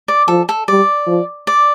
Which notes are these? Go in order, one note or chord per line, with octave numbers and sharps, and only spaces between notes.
D5
F3 A4
A4
G3 D5
F3
D5